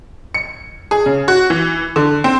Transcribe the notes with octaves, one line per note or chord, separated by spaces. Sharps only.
C#7
G#4
C#3
F#4
E3
D3
C4